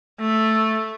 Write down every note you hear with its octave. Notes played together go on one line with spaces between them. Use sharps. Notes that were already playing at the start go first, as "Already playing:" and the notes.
A3